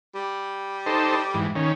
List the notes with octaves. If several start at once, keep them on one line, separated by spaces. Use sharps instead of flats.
G3
D#4 A4 C5
G#2 E3
D#3 C#4